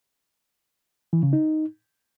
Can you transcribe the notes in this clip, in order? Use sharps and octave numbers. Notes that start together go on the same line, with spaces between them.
E3
C#3
D#4